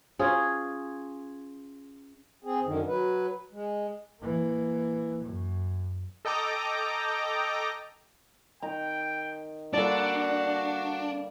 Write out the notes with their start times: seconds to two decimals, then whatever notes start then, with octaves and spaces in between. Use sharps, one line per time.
0.19 C#4 F4 G#4
2.44 C4 G#4
2.63 F#2 D3 D#3
2.87 F#3 B4
3.52 G#3
4.20 E3 A#3
5.23 F#2
6.25 A4 D#5 G5 A#5 D6
8.62 D#3 G5 A#5
9.73 D3 G3 A#3 D4 F#4 A4 D5